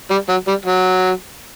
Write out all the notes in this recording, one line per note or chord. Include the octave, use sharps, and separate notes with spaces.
G3
F#3
G3
F#3